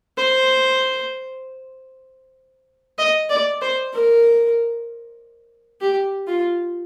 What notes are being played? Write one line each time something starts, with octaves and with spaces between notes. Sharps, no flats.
C5
D#5
D5
C5
A#4
G4
F4